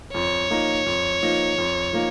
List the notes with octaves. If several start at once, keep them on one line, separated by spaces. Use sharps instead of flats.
F2 C#5
F3 A#3 D#4
F2
F3 A#3 D#4
F2
F3 A#3 D#4